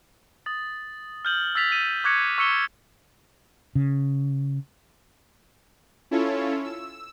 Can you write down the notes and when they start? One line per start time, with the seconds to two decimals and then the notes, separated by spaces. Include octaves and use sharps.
0.46 D#6 A6
1.25 F6 G6 F#7 G7
1.55 E6 A6 B6 F7
1.72 D#7
2.04 C#6 D6 F#6 G#6 A#6 C#7
2.38 C#6 E6 F#6 C#7 E7 G7
3.75 C#3
6.11 C#4 E4 F4 A4 C#5
6.64 E6